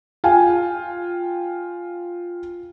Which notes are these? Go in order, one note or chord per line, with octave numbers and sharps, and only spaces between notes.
F4 F5 G5 G#5